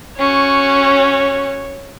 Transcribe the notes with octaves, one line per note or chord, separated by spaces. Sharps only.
C#4 F#4 C#5